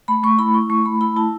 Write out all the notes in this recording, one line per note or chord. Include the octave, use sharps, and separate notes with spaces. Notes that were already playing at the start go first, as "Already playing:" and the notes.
A3 B5
A3 C#6
E4 B5
E4 C#6
A3 C#6
A3 B5
E4 B5
E4 A5